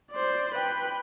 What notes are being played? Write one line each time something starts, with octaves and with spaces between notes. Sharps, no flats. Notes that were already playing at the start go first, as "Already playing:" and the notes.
C5 D5
B4 G5